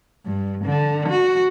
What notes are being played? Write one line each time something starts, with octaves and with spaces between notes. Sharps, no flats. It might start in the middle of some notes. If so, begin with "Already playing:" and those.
G2
D3
F#4